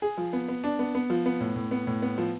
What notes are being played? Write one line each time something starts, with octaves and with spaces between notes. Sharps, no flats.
G#4
F3
B3
B3
D4
B3
B3
F3
B3
A2
A2
B3
A2
B3
F3